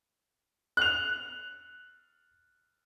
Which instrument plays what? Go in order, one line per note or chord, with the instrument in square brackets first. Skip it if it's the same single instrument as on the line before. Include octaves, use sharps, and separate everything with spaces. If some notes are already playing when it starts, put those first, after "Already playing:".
[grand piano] F#6 F7